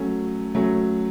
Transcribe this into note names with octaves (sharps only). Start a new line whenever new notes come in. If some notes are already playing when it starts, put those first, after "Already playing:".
Already playing: F#3 A3 C#4
F#3 A3 C#4